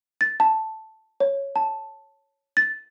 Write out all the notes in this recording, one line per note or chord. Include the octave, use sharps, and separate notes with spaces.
A6
A5
C#5
A5
A6